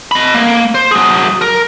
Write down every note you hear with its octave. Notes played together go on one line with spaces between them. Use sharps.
D#5 B5
A#3
C5
F#3 G#4
A#4